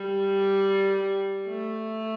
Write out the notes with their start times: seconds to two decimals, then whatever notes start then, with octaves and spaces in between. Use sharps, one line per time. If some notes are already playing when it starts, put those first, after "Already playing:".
Already playing: G3
1.48 A3